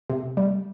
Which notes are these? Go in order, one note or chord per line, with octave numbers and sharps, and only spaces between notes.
C3
G3